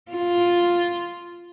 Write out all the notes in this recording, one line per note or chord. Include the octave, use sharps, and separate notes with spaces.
F4